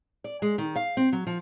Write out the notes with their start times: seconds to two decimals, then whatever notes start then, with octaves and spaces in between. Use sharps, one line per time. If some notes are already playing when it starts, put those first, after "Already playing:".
0.24 D5
0.42 G#3
0.58 D#3
0.76 F5
0.97 C4
1.13 F#3
1.27 F3